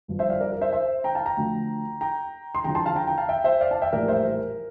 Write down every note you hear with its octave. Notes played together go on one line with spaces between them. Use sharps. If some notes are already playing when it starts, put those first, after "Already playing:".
G1 G2 F3
C5 E5
D5 F5
A#4 D5
A#4
C5 E5
C5 E5
G5 A#5
F5 A5
G5 A#5
D2 D3 F3
G5 A#5
C6
E2 D3 F3 G5 A#5
A5 C6
F5 A5
G5 A#5
G5 A#5
F5 A5
E5 G5
C5 E5
D5 F5
F5 A5
E5 G5
A#1 A2 E3 G3 A#4 D5
C5 E5
A#4